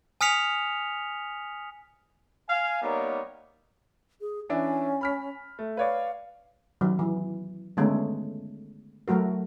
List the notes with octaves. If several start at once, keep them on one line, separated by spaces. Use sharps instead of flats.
G#5 D#6 F6 B6 C#7 F7
F5 G#5
G3 A#3 B3 D#4 A#4 C#5
G#4
E3 C#4 D4 E5
B5 F6 B6
A3
B4 C#5 D5 F5
D#3 F#3
E3
D3 D#3 G#3 A3 B3 C#4
F#3 A3 F#4 A#4